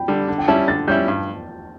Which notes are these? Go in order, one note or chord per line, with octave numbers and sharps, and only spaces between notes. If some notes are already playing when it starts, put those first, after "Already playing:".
Already playing: G5 B5
D3 G3
D3
G5
G3 C#4 E4 A5
D3 A6
G3 C#4 E4 G6
G2